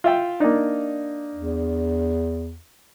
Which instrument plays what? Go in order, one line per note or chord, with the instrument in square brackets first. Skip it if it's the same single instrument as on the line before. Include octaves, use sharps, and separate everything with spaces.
[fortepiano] F4 E5 G5
[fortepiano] A#3 D#4 [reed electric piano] D4 D5
[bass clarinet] E2